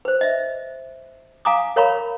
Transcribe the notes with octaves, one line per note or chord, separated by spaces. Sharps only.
B4 C5
D#5 E5
F5 G#5 A#5 D6 D#6
A#4 C#5 F5 A#5 B5 C#6